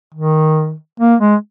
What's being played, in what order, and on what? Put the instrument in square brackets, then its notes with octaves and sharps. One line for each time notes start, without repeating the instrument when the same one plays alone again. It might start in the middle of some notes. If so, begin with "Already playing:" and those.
[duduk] D#3
A#3
G#3